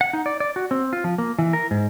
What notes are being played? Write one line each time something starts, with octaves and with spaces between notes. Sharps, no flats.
F#5
D#4
D5
D5
F#4
C4
F4
F3
A#3
E3
A#4
G#2